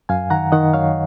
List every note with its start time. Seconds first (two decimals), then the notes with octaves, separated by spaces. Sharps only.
0.09 F#2 F5 G#5
0.30 D#3 F#5 A#5
0.52 D#3 D#5 F#5
0.74 F#2 C#5 F5